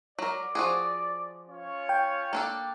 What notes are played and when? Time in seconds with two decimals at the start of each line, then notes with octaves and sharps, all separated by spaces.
0.19 F#3 A#4 D5
0.55 F3 F#4 G#4
1.48 C#4 F4 C#5
1.89 G5
2.33 A#3 D4 A4